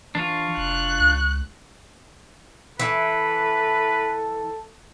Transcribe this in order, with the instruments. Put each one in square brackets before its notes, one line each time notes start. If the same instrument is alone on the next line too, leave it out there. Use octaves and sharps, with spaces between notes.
[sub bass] E3 [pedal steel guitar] D4 F4 [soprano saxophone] C#6
[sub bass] F1 [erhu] F#6
[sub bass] C#2
[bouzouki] E3 [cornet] A4 [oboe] B4